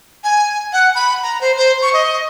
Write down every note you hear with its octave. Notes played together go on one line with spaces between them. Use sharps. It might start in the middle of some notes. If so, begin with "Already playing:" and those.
G#5
F#5
B5
A#5
C5
C5
C#6
D#5